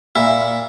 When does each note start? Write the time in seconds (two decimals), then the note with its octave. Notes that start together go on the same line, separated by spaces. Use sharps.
0.15 A#2 E4